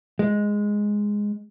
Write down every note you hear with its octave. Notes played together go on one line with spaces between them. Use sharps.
G#3